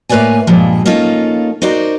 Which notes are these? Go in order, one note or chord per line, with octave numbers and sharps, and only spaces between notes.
A2 A#3 B4 C#5 D5 G#5
G2 A#2 F3 G3 G#3
A#3 C#4 D#4 F4 A4
D#4 F#4 A#4 C5 D5